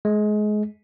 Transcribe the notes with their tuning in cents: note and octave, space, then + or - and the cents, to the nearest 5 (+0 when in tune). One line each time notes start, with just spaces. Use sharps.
G#3 +25